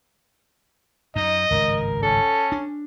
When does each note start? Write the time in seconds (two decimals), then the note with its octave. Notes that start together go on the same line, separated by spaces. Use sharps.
1.16 F#2 D#4 D#5
1.51 G#1 C#2 G2 A#4
2.03 C#4 A4
2.52 D4